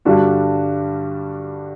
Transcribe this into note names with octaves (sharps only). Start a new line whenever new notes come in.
G2 D3 G3 D4 F#4